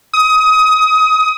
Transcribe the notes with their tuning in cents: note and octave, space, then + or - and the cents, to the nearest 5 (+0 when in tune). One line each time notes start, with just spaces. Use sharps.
D#6 +25